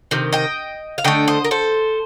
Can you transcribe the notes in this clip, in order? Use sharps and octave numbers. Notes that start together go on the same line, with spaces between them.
C3 D#3
D#5 G5
F5
D3 A3 D#5 G5
C5 D#5
A#4
A4 C5